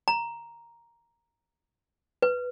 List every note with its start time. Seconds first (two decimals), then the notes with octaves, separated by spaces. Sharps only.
0.08 A#5
2.22 B4